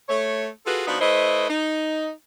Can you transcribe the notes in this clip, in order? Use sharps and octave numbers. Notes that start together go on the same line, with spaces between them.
A3 C#5
F4 F#4 G#4 A4 B4
F3 B3 D4 D#4 F4 F#4
A3 E4 B4 C5 D#5
D#4